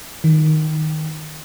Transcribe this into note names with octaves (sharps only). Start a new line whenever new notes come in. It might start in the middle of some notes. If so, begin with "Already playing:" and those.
D#3